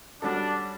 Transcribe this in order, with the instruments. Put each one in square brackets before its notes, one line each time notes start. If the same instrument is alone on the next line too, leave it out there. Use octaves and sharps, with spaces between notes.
[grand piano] G3 C#4 F#4 A4 [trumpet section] D4